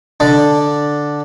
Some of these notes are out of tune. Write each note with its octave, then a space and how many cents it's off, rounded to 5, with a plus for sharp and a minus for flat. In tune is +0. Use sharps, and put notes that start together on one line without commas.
D3 +0 D4 +0